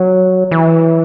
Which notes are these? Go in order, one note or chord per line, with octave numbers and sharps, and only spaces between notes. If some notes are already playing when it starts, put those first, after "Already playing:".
Already playing: F#3
E3